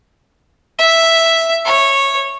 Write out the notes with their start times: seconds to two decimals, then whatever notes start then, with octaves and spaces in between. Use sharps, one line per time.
0.79 E5
1.66 C#5